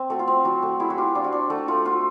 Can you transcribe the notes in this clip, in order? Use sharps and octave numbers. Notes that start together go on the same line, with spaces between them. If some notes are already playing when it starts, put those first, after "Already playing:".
Already playing: C4
A3 F#4
F4
C4
F#3 F#4
A3 F#4
E4 G#4
F#4
F4 G4
D4 F4
F#4
D4
A3 F#4
A3 F4
F4 F#4